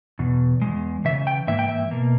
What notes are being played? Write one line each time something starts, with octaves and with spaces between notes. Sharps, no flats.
E2 B2
E2 C#3 G#3
C#3 E3 E5
G5
G#2 E3 A#3 E5
G5
E5
B2 A#3